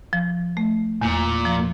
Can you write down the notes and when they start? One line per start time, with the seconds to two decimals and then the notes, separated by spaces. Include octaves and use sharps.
0.13 F3
0.57 A3
1.01 E2 A#2
1.45 F3